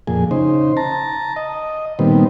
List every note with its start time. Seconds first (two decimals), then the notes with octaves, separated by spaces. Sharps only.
0.07 F2 A#2 G#4
0.31 C#3 D#4 C5
0.77 A5 A#5
1.36 D#5
1.99 A#2 D#3 G3 B3 C4